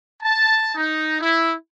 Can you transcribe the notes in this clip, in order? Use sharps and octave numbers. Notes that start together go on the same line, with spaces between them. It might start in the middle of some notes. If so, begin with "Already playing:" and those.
A5
D#4
E4